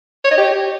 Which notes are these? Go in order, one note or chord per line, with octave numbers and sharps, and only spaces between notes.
C#5
D#5
G4